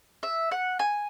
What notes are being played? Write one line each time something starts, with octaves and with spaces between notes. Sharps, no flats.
E5
F#5
G#5